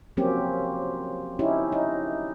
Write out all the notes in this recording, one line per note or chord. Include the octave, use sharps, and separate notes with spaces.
F3 F#3 A#3 C4 C#4 G4
C#4 D#4 E4 G4
D#4